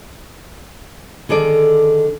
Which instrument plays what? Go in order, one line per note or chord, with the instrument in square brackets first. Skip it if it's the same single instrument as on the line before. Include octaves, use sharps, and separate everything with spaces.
[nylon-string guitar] D3 D#3 G#4 A4 D5